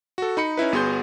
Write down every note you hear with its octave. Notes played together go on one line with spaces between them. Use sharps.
F#4 A4
D#4 B5 C#7
C#4 D#4 E4 B4
G1 B3 F#4 G#4 C6 G6